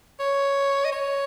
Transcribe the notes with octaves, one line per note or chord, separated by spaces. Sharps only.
C#5
D#5
C#5